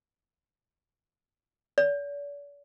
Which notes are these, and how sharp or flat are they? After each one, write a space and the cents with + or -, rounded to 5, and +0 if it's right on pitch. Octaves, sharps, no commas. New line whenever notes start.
D5 -45